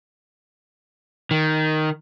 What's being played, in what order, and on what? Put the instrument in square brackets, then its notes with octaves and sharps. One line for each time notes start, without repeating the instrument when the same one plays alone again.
[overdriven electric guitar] D#3